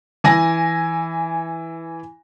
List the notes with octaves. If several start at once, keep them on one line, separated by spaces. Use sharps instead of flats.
E3 G#5 A#6